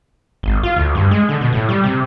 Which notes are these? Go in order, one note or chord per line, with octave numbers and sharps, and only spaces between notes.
G#1
F4
D2
G2
G#3
D3
B2
A2
G3
C3